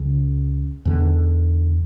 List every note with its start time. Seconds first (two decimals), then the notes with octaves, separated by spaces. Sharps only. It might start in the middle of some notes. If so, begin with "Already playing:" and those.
Already playing: C#2 C#3
0.85 E2 D3